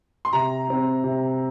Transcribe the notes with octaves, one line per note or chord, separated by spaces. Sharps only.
C6
C3 A#5
G3 C4
C3